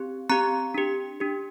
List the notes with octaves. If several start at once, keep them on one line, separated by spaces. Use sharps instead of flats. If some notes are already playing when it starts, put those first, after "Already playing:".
Already playing: C4 G4
C4 G4 A#5
D4 G4
D4 G4